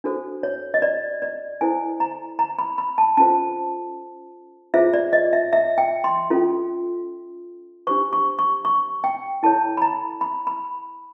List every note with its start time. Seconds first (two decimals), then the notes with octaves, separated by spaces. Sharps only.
0.04 D4 F#4 A4 C5
0.43 C#5
0.74 D#5
0.82 D5
1.22 D5
1.61 E4 A4 C5 G#5
2.00 A#5
2.39 A#5
2.59 B5
2.78 B5
2.98 A5
3.17 C#4 F4 A4 C5 A5
4.74 F4 G#4 C5 E5
4.94 D5
5.13 D#5
5.33 E5
5.53 E5
5.78 G5
6.04 C6
6.30 C#4 F4 A4
7.87 D4 G4 C5 C#6
8.13 C#6
8.39 C#6
8.65 C#6
9.04 G5
9.43 E4 A4 C#5 A5
9.77 B5
9.82 A#5
10.21 B5
10.47 B5